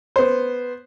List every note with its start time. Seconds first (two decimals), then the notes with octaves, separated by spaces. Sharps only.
0.16 B3 C5